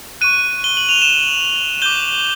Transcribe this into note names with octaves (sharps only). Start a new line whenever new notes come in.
C#6 F#6 D#7
G7
F#7
F7
E7
D6 G6 G7